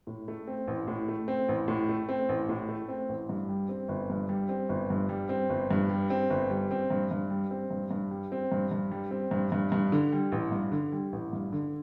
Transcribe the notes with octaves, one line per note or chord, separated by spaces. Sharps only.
A2
A3
C4
A1
A2
A3
C4
A1
A2
A3
C4
A1
A2
A3
C4
A1
G2
G3
C4
G1
G2
G3
C4
G1
G2
G3
C4
G1
G2
G3
C4
G1
G3
C4
G2
G2
G3
C4
G2
G2
G3
C4
G2
G2
G3
C4
G2
G2
G2
D3
G3
A1
G2
D3
G3
A1
G2
D3